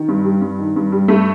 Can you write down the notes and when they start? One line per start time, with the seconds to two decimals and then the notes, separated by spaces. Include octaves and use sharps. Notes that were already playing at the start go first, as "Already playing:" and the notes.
Already playing: D#3
0.08 G2
0.25 G3
0.41 G2
0.59 D#3
0.76 G2
0.92 G3
1.08 G2 A3